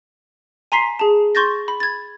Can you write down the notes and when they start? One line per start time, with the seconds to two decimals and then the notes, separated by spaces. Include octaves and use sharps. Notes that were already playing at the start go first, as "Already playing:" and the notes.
0.72 G#5 A#5 C6 B6 C7
0.99 G#4 A5
1.35 C6 C#6 G6 A6 A#6
1.68 B5
1.80 G#6 A6